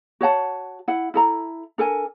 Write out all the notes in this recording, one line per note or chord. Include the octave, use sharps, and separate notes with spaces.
F#4 C#5 F#5 A5
E4 F#5
E4 A4 A#5
D4 A4 A#4 G#5